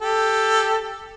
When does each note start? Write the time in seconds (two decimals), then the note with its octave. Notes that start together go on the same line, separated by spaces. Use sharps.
0.01 G4 A4